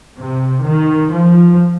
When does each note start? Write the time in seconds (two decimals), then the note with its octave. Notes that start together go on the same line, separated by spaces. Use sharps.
0.19 C3
0.66 D#3
1.13 F3